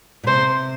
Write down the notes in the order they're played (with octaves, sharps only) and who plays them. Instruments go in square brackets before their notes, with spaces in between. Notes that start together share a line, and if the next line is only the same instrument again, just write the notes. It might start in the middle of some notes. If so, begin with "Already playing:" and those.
[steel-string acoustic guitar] A#2
[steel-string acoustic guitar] C3 [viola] C5